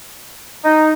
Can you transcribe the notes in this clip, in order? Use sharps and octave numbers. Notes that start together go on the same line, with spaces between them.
D#4